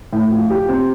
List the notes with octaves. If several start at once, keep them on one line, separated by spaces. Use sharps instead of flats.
A2
F3
G4
C4